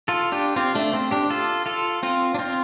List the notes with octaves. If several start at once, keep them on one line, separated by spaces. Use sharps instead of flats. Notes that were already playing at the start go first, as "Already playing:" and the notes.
F4 A4
D4 G4
C4 F4
A3 D4
C4
D4 G4
F4 A4
F4 A4
C4 F4
D4
C4 F4